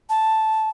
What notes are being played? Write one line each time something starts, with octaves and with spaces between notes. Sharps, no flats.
A5